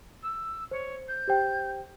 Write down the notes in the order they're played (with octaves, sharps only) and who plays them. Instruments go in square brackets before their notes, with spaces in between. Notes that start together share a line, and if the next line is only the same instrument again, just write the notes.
[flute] E6
[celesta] C5 [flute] C#5
[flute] G6
[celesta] G4 C5 G5